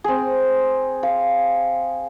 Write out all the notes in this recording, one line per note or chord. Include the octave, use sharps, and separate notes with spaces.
C4 G#4
F5